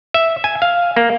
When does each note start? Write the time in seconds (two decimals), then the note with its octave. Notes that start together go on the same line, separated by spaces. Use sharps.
0.14 E5
0.44 G#5
0.62 F5
0.96 A#3